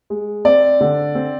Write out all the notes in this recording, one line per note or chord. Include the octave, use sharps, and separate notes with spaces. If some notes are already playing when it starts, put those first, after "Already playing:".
G#3
C4 D5
D3
C4